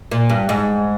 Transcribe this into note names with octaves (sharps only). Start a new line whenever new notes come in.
A#2
G2
G#2